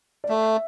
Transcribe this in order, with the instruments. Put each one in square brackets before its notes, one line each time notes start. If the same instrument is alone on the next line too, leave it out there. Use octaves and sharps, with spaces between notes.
[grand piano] D5
[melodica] A3 [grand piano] E5